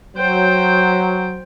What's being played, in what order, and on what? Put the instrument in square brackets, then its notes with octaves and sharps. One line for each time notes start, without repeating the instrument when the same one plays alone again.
[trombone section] F#3 [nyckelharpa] C5 G5